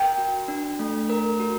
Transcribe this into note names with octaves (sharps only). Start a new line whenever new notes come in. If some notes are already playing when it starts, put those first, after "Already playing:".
Already playing: A#4 G5
F#4
D4
A3
A#4
F#4